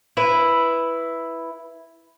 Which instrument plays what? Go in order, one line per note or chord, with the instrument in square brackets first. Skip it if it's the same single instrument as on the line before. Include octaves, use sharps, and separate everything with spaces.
[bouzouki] E4 B4